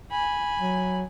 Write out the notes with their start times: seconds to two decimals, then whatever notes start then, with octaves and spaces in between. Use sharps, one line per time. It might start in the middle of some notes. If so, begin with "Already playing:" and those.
0.11 G#5 B5
0.59 F#3